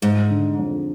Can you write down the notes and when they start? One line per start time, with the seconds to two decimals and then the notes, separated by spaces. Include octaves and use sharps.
0.02 G#2 G#3
0.30 D3
0.59 F2